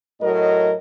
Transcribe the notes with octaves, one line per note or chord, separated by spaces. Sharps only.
A2 F#3 A#4 D#5